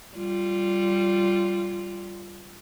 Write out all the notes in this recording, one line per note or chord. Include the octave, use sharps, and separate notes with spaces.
G3 F4